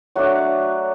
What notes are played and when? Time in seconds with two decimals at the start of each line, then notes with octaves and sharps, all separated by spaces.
0.15 F#3 A3 D4 F#4